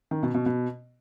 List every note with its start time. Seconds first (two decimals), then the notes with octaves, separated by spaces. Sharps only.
0.11 D#3
0.23 B2
0.34 B2
0.46 B2